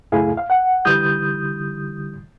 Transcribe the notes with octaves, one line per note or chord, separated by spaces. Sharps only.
C#2 F#2 A3 E4 G#4 F5
F5
F#5
D3 E3 G3 D#6 G6